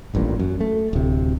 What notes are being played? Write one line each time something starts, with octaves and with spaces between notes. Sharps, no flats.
D#1 A1 G2 A#2
F#2
A3
D1 C3